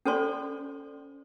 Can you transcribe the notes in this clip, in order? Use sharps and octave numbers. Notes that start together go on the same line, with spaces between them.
C#4 A4 C5 D5 C6